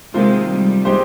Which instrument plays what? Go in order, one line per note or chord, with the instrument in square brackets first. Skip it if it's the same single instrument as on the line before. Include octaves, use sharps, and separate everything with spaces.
[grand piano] C3 D#3 A#3 F4 C5 [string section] G#3
[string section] G3
[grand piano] G#3 D#4 G4 C5